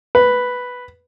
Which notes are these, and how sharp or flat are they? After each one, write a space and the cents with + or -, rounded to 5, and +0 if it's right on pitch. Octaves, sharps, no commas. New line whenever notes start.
B4 +0